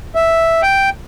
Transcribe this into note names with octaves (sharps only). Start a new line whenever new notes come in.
E5
G5